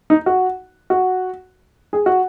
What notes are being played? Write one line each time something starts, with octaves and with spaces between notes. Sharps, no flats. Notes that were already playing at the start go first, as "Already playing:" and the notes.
D#4
F#4
F#4
G#4
F#4